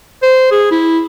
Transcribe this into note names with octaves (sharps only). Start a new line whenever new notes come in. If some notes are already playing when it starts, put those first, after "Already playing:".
C5
G#4
E4